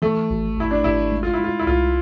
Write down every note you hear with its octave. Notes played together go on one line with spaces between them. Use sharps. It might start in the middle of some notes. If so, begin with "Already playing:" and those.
E3 A3
G#1
G#1 E4
D4
G#1 E4
G#3
F4
E4
G#3 F4
E4
C2 F4